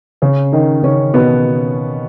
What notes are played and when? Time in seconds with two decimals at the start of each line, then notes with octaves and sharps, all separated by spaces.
0.22 C#3 C#4
0.52 D#3 D#4
0.83 C#3 C#4
1.14 B2 B3